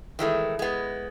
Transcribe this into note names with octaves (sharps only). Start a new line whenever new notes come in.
D#3 E3 G#3 A3
G#3 B3